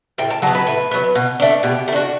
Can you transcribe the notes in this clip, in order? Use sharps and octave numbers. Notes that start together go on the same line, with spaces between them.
A2 G5
A5
F#3 B3 A5
B4
A2
F#3 B3
B2
A3 D4
B2 G4
A3
D4 F#4